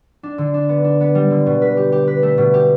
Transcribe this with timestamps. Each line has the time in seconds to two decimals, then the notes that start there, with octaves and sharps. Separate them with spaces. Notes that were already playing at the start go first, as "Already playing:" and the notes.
0.23 D4
0.38 D3
0.54 D4
0.69 B3
0.84 D4
1.01 B3
1.15 G3
1.31 D3
1.46 B2
1.62 B4
1.77 G4
1.92 G4
2.07 B4
2.23 A3
2.38 B2
2.54 G4